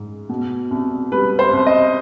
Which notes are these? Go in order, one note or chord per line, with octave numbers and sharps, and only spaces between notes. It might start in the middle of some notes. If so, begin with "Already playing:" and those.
Already playing: G#2 G#3
B2
C2
G3 B4
C5
C2
D#5